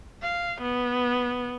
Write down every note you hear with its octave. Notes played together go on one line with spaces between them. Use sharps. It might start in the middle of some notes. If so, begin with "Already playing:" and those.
F5
B3